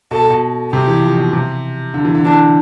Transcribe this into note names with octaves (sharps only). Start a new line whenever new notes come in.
B2 A4
B2
C3 G4
E3
F3
B2
C3
D3
E3
D3
E3 D4